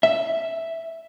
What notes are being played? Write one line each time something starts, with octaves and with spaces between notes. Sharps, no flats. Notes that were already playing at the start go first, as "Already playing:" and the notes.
E5